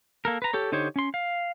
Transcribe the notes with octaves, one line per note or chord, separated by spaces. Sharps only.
A#3 A4 A#4
B4 A#5
G4 A4 C#5
D3 D#4 G4 C5 C#5
C#4 C6
F5